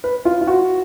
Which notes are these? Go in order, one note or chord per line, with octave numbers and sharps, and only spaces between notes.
B4
F4
F4
F#4